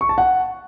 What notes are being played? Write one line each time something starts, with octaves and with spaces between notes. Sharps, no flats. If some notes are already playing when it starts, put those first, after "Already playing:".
C#6
A5
F#5